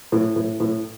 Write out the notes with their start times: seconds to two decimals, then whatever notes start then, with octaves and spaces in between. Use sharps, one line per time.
0.12 A2
0.36 A2
0.60 A2